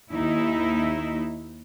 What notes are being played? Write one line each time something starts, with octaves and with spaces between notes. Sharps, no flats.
D#2 D#4 E4 E5